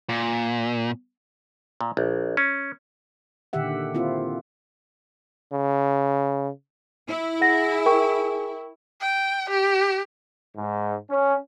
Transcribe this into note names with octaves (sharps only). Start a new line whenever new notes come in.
A#2
A#2
A#1
C#4
A#2 D3 D#3 G4 E5 F#5
A#3 C4 E4 F4
C#3
E4
G#4 F#5 A#6
A#4 G5 C#6
G5
G4
G#2
C#4